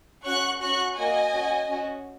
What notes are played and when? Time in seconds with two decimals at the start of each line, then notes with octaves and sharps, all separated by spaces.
0.24 C#4 F#4 C#6 F#6
0.61 C#4 F#4 C#6 F#6
0.96 A#3 F#4 D#5 G#5
1.33 C#4 F#4
1.68 C#4 F#4